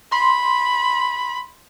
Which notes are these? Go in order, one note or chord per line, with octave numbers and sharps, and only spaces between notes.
B5 C6